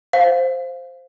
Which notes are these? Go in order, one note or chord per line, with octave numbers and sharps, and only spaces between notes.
C5 F5